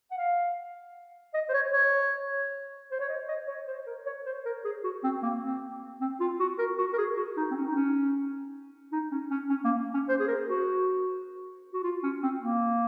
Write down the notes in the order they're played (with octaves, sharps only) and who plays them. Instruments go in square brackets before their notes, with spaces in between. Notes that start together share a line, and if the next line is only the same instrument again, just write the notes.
[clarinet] F#5
F5
D#5
C5
C#5
C#5
C5
C#5
D#5
D#5
C#5
C5
A#4
C#5
C5
A#4
G#4
F#4
C4
A#3
C4
C4
F4
F#4
A#4
F#4
A#4
G#4
F#4
D#4
C4
C#4
D#4
C#4
D#4
C#4
C#4
C#4
A#3
C#4
C5
G#4
A#4
F#4
F#4
F4
C#4
C4
A#3